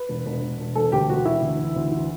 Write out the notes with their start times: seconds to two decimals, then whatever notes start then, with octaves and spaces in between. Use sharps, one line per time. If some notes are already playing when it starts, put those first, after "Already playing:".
Already playing: B4
0.09 E1
0.26 E1
0.42 E1
0.59 E1
0.75 E1 A4
0.92 D2 G4
1.09 E1 F#4
1.25 E3 E4
1.42 D2
1.58 E3
1.76 D2
1.92 E3